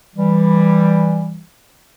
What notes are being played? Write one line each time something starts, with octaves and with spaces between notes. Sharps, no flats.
E3 G3